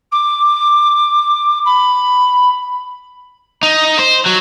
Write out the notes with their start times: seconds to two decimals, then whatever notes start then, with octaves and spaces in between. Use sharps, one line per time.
0.12 D6
1.65 B5
3.63 D#4
3.98 C5
4.26 F#3